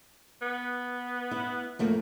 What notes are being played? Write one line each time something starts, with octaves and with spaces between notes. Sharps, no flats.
B3
E4
F2 A3 A#3